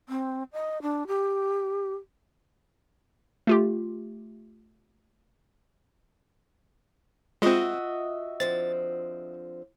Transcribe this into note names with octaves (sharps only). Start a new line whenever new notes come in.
C4
D#5
D4
G4
A3 F4 G4
G#3 C4 F4 F#4 D#5 E5
D3 F3 C4 A6